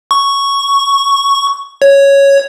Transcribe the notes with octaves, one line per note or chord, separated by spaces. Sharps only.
C#6
C#5